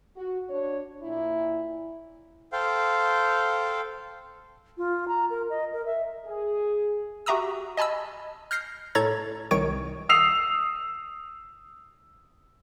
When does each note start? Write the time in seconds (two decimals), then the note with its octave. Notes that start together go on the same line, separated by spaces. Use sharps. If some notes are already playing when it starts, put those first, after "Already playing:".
0.16 F#4
0.50 D4 C#5
1.03 A#2 E4
2.52 A4 C5 F5 G5
4.78 F4
5.08 A#5
5.30 A#4
5.50 D#5
5.72 A#4
5.86 E5
6.26 G#4
7.26 F#4 G4 E5 A#5 D#6 E6
7.77 D#5 G#5 A5 B5 E6
8.51 F6 G6 A#6 C7
8.95 A2 A4 C#5 A#5 G#6 A6
9.51 C2 D#3 C#5 C#6 D7
10.09 D#6 E6 C7 F7